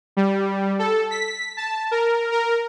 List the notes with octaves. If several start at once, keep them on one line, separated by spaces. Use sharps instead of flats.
G3
A4
B6
A5
A#4
A#4